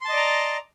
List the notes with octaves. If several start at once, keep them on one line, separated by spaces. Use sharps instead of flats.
D5 D#5 A5 A#5 C6